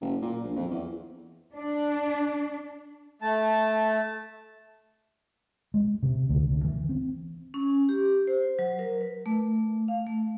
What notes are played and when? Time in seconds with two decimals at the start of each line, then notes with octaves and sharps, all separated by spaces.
0.01 F#1
0.22 A#2
0.45 A#1
0.56 F2
0.71 E2
1.56 D4
3.22 A3 A5
5.74 G#3
6.03 C3
6.29 D2
6.51 D2
6.64 E3
6.89 C4
7.54 C#4
7.89 G4
8.27 C5
8.59 F#3
8.79 A#4
9.01 B4
9.26 A3
9.88 F5
10.06 A3